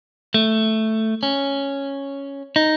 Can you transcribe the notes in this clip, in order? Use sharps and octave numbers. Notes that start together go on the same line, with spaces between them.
A3
C#4
D#4